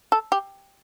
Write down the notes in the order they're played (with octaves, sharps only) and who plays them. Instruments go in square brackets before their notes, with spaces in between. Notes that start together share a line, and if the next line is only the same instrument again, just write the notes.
[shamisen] A4
G4